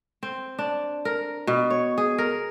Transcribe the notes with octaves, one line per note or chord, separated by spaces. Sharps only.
C4
D4
A#4
B2
C#5
G#4
A#4